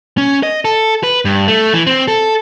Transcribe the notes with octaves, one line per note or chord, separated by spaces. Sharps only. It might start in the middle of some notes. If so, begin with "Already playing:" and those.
C#4
D#5
A4
B4
G2
A3
E3
C4
A4